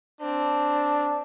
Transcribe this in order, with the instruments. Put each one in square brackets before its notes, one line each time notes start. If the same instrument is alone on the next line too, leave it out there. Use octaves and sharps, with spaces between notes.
[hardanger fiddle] C4 [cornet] D4